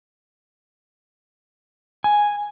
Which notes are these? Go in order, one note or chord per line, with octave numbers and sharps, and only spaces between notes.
G#5